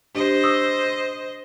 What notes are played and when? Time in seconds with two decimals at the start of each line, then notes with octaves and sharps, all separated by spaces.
0.15 D4 G4 C5 D#5
0.43 C#6 D#6 E6